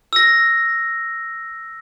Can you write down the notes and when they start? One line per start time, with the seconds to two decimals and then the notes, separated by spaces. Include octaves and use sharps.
0.13 E6 A#6